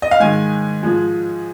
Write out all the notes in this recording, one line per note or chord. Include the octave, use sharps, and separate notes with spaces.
D#5
F5
G#2 D#3 G#3 G#5
G#2 F3 G#3